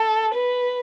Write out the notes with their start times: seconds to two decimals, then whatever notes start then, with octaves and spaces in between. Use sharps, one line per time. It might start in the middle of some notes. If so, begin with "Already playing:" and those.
Already playing: A4
0.34 B4